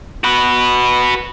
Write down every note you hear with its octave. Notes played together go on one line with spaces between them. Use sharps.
F#4 B4